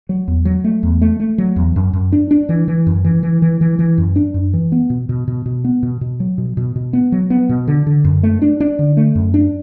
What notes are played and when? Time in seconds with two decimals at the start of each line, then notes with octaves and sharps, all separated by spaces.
0.09 F#3
0.28 E2
0.45 F#3
0.64 A3
0.83 E2
1.02 A3
1.20 A3
1.38 F#3
1.56 E2
1.76 F#2
1.93 F#2
2.12 D4
2.31 D4
2.49 E3
2.68 E3
2.87 F#2
3.04 E3
3.23 E3
3.42 E3
3.61 E3
3.79 E3
3.98 F#2
4.16 D4
4.34 F#2
4.54 E3
4.72 B3
4.90 B2
5.09 B2
5.28 B2
5.46 B2
5.64 B3
5.83 B2
6.01 B2
6.20 F#3
6.38 B2
6.57 B2
6.76 B2
6.93 B3
7.12 F#3
7.30 B3
7.49 B2
7.68 D3
7.87 D3
8.05 F#2
8.23 A3
8.42 D4
8.60 D4
8.79 D3
8.97 A3
9.15 F#2
9.34 D4